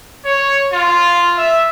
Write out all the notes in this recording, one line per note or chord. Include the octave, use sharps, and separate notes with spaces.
C#5
F4
E5